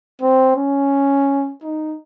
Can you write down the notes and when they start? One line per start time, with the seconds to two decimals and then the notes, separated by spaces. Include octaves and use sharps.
0.21 C4
0.56 C#4
1.63 D#4